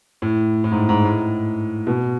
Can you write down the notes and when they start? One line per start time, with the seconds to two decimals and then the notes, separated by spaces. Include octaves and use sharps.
0.22 A2
0.64 A2
0.72 G#2
0.89 G#2
1.05 A2
1.87 B2